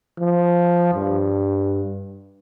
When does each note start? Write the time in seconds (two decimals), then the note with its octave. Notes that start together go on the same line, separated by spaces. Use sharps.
0.19 F3
0.94 G2